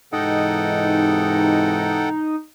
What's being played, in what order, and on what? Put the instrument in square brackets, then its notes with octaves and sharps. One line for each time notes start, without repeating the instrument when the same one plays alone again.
[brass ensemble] G#2 C3 E3 [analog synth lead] D#4 [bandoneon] A4 F#5 G5